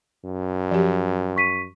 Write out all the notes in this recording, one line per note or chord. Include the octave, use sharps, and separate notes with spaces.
F#2
F3 G4
C#6 B6 D#7